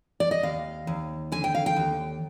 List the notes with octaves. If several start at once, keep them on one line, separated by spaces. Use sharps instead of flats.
D5
D#5
D#2 F5
D#2
D3 G#5
G5
F5
G5
D#2